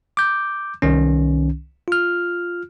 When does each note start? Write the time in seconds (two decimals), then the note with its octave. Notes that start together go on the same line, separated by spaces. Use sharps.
0.17 D6 G6
0.82 C2 D#3 C#4
1.88 F4 F6